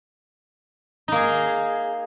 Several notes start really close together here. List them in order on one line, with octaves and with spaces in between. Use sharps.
D#4 A#3 G#4